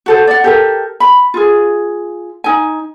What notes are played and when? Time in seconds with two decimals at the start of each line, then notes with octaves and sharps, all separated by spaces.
0.06 F#4 A4 C5
0.27 D5 F#5
0.44 G4 A4 A#4
1.00 B5
1.34 F4 G#4
2.44 D#4 G#5